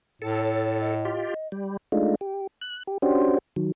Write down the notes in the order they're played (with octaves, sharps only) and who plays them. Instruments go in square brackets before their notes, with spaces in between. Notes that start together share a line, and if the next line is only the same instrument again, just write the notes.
[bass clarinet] A2 [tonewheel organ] A4
[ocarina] C#5
D#5
[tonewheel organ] F4 G4
G3
G#3 A3 D4 D#4 F4
G4
F#6
G4
C#4 D4 F#4 G4 C5
D#3 F#3